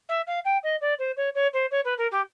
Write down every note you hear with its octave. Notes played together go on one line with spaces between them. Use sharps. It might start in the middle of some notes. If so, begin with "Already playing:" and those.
E5
F5
G5
D#5
D5
C5
C#5
C#5
C5
C#5
B4
A#4
G4